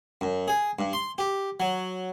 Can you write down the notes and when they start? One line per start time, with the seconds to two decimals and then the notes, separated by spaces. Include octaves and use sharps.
0.21 F#2
0.48 G#4
0.79 G2
0.93 C6
1.18 G4
1.60 F#3